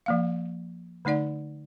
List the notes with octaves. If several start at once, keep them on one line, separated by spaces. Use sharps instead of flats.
F3 A#3 F5
D3 A3 D#4 D5 F#5